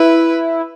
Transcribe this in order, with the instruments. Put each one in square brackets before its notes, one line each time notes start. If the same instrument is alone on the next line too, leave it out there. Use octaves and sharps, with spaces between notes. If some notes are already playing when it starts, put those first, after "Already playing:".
Already playing: [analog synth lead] E4 [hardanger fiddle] B4